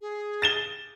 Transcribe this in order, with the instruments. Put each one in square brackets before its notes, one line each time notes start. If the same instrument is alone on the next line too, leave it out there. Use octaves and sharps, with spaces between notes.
[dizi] G#4
[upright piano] A6 E7 G7